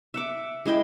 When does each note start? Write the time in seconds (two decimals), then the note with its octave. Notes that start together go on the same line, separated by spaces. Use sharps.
0.14 E5 F#5 D6
0.66 G#3 E4 D#5 G5